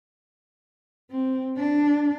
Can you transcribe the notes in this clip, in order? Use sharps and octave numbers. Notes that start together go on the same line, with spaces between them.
C4
D4